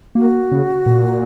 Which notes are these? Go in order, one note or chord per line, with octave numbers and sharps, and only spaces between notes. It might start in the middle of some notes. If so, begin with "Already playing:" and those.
A#3 F#4
C#3
A#2